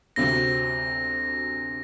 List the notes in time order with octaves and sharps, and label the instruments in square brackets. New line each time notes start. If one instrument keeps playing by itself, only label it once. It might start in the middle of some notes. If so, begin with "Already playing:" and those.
[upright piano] D2 C3 F#3 C4 [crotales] A#6